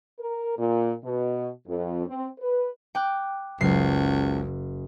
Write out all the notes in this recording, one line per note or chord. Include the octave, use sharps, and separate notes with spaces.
A#4
A#2
B2
F2
C4
B4
G5 D6 F#6
F#1 C#2 C7